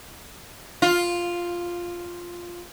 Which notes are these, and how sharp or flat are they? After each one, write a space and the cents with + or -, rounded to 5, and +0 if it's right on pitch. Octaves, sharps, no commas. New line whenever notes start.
F4 +0